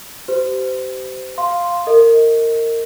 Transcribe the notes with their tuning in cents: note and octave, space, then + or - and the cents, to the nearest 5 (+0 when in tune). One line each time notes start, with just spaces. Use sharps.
G4 -30 C5 -30
F5 +0 C6 +0
A#4 -25 D#5 +20